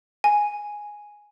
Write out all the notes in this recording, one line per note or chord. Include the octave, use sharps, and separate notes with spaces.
G#5